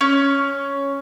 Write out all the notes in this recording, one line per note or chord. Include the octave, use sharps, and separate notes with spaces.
C#4